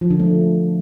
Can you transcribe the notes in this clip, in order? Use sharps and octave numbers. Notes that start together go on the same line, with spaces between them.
F3
D3
A3